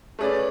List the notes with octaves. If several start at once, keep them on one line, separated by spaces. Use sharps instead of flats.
A3 C#4 G#4 B4 D5